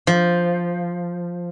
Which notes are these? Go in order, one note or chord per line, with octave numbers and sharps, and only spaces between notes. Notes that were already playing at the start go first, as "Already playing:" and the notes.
F3